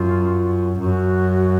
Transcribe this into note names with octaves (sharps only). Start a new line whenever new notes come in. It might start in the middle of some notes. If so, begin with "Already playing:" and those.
Already playing: F#2 F4
F#2 F#4